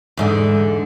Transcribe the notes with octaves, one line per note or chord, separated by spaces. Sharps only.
E2 G#2 D3